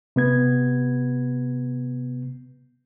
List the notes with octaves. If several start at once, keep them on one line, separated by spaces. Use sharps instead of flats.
C3 B3 G#6